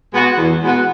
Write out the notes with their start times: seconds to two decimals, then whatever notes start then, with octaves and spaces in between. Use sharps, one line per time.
0.12 B2 G#3 B3 F#4
0.37 E2
0.62 B2 G#3 B3 F#4